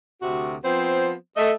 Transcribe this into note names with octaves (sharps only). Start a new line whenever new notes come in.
D2 C3 F#4
F3 B3 C4 C5
A3 D#5